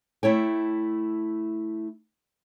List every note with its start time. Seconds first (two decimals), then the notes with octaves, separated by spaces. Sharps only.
0.23 A3 E4 C#5 G5